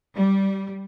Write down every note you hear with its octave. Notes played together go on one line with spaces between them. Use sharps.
G3